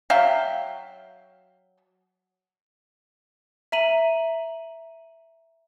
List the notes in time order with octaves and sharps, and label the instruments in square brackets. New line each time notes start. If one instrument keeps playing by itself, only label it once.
[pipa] F#3 E5 F5 G5
[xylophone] E5 A#5 D#7 F#7